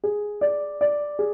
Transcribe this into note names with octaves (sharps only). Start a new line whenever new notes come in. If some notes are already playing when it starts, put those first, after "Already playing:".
G#4
D5
D5
G#4